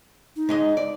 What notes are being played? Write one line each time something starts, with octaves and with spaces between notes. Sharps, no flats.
D#4
G#2 G#3 D#5
D5